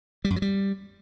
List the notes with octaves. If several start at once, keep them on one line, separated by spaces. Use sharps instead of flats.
G3
F#2
F#3
G3